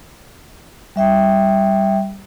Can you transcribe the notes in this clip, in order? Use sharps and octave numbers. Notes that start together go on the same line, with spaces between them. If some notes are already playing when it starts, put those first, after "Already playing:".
G3 E5 G5